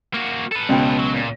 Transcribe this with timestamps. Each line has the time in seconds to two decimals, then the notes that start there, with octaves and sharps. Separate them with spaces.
0.14 A#3 F#4
0.51 A4 B4
0.69 C#2 B2 G5
0.99 F#3
1.15 A#2